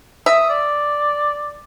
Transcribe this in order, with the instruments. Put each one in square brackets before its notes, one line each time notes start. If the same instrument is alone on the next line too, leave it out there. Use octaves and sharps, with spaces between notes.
[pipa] E5 [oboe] D#6
[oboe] D5